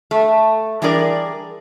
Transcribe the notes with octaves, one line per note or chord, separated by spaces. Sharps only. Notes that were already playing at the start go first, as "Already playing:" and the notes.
A3
E3 G3 D4 G#4 A#4 D5